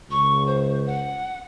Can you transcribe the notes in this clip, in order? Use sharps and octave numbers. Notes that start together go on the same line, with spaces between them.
C#2 C#6
C5
F#5